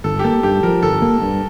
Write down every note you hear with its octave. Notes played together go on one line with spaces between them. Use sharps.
G1 A4
G4
A#3 A4
G2 G4
F3 A#4
G1 A4
A#3
G2